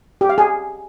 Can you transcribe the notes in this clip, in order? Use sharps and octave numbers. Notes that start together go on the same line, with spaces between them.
G4
F5
G#4